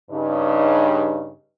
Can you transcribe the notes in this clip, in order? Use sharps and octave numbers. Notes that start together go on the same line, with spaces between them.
G2 C#3 D#4